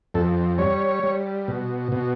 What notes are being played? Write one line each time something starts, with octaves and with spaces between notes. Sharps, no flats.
F2 A4
G3 C#5
G3
B2
B2